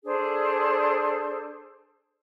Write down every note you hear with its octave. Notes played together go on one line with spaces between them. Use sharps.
D4 G#4 A4 C5